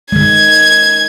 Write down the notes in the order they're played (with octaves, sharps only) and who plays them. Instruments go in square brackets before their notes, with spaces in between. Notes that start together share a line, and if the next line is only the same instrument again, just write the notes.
[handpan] D#3 G#3 [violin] G#6